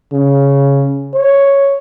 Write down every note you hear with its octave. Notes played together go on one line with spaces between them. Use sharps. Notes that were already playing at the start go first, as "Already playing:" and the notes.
C#3
C#5